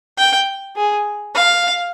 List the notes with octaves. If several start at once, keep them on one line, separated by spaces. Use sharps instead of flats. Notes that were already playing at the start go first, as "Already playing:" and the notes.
G5
G#4
F5